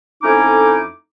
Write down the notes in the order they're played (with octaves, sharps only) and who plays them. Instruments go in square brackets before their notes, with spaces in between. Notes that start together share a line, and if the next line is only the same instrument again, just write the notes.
[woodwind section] F2 A3 C#4 D#4 E4 D6